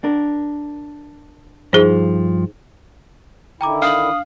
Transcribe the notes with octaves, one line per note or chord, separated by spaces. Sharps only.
D4 A#4
G2 F3 D#4 G#4 C5
D3 D#3 E4 G5 A#5 D6
D4 F5 D#6 F#7